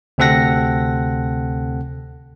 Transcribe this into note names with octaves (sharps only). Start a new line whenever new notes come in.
D2 C3 C4 A4 F#5 A#6